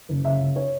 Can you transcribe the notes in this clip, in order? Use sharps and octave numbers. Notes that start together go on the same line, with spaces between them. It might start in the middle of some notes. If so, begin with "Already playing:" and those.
F#1
C#3 E5
C#2
C#5